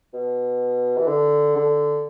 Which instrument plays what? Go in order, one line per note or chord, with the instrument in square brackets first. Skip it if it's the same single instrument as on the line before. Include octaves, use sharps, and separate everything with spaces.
[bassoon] B2
E3
D3
D3